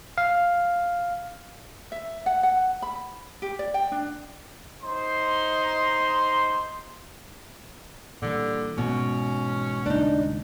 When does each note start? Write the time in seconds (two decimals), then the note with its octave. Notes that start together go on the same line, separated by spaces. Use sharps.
0.18 F5
1.92 E5
2.26 F#5
2.43 F#5
2.82 B5
3.42 G4
3.59 D5
3.74 G5
3.92 D4
4.82 D#4 C5 C6
8.22 A#2 D3 E3 G3
8.78 G#2 B2 E3 C#4
9.86 D#1 C#2 D4 D#4